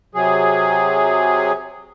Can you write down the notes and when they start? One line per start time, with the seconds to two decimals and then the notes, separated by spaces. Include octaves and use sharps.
0.15 C3 F#3 G#4